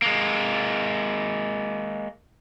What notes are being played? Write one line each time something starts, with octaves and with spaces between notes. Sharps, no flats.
G#3 A#3